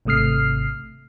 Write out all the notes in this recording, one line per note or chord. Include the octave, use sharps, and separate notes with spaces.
G#1 C3 A3 D#6 F6 C7